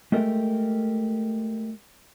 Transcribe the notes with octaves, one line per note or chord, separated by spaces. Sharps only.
G#3 A3 G4 A4 A#4